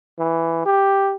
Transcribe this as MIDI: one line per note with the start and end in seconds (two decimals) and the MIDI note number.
0.19 0.64 52
0.65 1.16 67